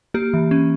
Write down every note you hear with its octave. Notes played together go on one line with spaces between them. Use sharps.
A#3 G4
E3
C#4